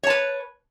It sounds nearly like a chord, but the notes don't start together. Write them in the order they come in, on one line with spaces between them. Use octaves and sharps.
C#5 A5 B4